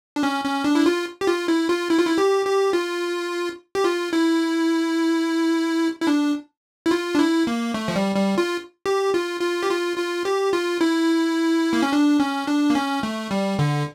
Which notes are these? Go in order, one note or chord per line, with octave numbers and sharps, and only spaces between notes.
D4
C#4
C#4
D4
E4
F4
G4
F4
E4
F4
E4
F4
E4
G4
G4
F4
G4
F4
E4
E4
D4
E4
F4
D4
E4
A#3
A3
F3
G3
G3
F4
G4
F4
F4
G4
F4
F4
G4
F4
E4
A#3
C#4
D4
C#4
D4
A#3
C#4
A3
G3
D3